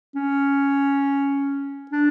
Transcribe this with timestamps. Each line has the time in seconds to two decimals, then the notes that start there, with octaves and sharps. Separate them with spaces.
0.15 C#4
1.91 D4